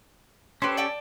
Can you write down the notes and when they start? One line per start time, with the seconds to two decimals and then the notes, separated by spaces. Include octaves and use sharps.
0.62 C#4 G4 A4 B4 C5
0.77 D5 G5 A5